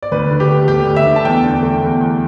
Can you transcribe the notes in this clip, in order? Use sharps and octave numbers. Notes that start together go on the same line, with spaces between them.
D5
D2 B4
D3
G4
A3
D2 G4
D2
E5
D3
A5
E2 G5
D3
A3
E2
E2